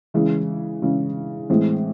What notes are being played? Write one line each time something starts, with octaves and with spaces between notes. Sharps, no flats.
C#3 E3 G#3
C#3 E3 G#3
A2 E3 G#3 C4